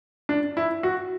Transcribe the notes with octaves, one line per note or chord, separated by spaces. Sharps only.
D4
E4
F#4